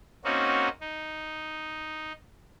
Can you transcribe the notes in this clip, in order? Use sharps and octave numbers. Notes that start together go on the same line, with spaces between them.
A#3 C4 C#4 D#4 F#4
D#4